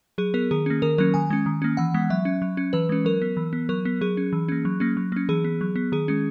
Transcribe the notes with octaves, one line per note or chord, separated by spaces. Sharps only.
F#3 G#4
B3 A#4
D#3 G#4
A#3 C#4
D#3 A#4
F#3 A#3 C#4 A#4
D#3 G#5
G#3 C#4
D#3
A#3 C#4
E3 F#5
G#3 B3
F#3 E5
C#4
F#3
C#4
E3 B4
G#3 C#4
F#3 A#4
B3
E3
B3
F#3 A#4
B3
F#3 G#4
C#4
E3
A#3 C#4
F#3
A#3 C#4
F#3
A#3 C#4
E3 G#4
B3
F#3
B3
D#3 G#4
G#3 C#4